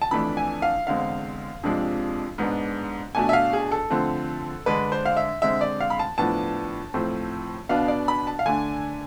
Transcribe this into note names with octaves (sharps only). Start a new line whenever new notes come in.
A5
F2 E3 A3 D4 B5
G#5
F5
E2 D3 G#3 C4 F5
F2 C3 F3 G#3 D4
G#2 G#3 B3 D4
B2 A3 D4 G#5
E5
F5
G#4
A4
D3 F3 A3 C4
D3 G#3 D4 B4
C5
F5
E5
D3 G#3 C4 E5
D5
F5
B5
A5
A2 F3 B3 D4 A5
A2 F3 A3 C4
B2 B3 D4 F5
D5
B5
A5
F5
D3 A3 D4 G#5